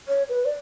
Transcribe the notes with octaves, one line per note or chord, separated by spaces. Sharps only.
C#5
B4
D5